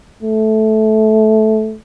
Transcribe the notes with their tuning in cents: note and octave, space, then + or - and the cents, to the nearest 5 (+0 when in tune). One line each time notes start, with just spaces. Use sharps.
A3 -15